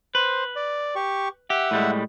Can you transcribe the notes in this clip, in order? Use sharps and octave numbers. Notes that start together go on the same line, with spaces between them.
B4 C5
D5
G4 C#6
G4 E5 F#5
A2 G3 G#3